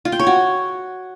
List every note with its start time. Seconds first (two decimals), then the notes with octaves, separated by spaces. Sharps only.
0.05 F4
0.12 G5
0.19 C#5
0.27 F#4